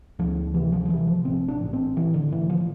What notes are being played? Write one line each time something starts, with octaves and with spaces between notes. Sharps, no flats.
D2 F3
C3 E3
F3
F3
C3 E3
F3
A1 C4
D4
A1
C4
A2 E3
D3
A2 E3
F3